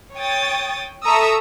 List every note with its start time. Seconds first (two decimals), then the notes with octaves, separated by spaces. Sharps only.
0.16 C#5 G5 D#6 A6
1.04 A4 E5 A#5 C#6 D#6 E6